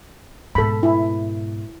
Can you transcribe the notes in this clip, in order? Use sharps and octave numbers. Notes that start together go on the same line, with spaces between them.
G#2 B2 A4 B5
E4